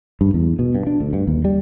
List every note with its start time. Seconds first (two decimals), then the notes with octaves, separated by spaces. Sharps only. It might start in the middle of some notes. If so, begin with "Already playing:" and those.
0.21 G2
0.34 E2
0.59 B2
0.75 G2
0.87 D4
1.00 D2
1.13 G2
1.27 D#2
1.45 G3